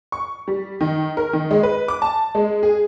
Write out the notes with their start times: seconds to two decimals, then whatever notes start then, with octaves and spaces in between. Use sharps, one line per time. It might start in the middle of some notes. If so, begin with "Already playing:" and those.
0.12 C#6
0.48 G3
0.81 D#3
1.17 A#4
1.33 D#3
1.51 G#3
1.63 B4
1.88 D6
2.02 A5
2.35 G#3
2.63 G#4